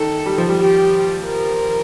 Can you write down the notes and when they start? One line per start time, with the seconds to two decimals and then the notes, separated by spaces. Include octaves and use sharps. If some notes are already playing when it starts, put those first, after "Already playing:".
Already playing: D#3 A4
0.26 G3
0.38 F3
0.49 G3
0.60 G4
1.26 A#4